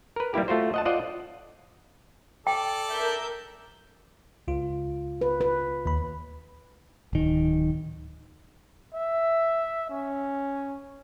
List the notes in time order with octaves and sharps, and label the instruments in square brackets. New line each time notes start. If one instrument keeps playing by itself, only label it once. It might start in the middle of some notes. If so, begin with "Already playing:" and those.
[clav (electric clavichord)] A#4 B4
G3 A#3 E4 G4
A3 F4 F#4 C5
D#5 F#5 A5
F4 C5 D5 D#5 F#5
[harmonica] A4 D5 [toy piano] G5
[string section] A#4 E5 G6
[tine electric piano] C#2 F4
[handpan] B4
B4
[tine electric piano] D#2 B5
[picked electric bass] D1 D#3
[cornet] E5
C#4